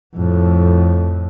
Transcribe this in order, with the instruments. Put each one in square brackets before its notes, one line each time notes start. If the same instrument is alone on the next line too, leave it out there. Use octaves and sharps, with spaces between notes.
[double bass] F2 A2